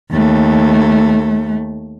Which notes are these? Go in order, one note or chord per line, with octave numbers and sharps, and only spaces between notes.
D#2 A3